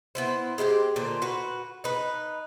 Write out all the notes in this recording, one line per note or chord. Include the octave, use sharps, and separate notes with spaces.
B3 E4 C5
G#3 C4 E4 G4
A#2 D3 C5
F#4 B4
D#4 B4